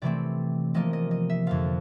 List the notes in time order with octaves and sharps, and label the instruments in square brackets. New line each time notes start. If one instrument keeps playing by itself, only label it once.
[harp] C3 E3 A3 C4 D5
C3 F3 A#3 D#5
D#5
D#5
E5
F2 D3 F3 F5